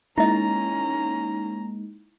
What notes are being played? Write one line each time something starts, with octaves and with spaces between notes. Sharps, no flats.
G#3 A#3 C#4 D#4 E4 D#5 A#5